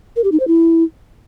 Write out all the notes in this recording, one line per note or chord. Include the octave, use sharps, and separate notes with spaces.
A#4
G4
D#4
C5
E4